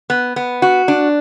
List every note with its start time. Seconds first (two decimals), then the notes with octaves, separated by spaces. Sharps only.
0.10 B3
0.36 B3
0.62 F#4
0.88 D4